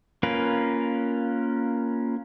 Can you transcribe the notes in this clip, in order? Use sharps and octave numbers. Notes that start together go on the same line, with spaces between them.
A#3 C#4 F4 A#4 B4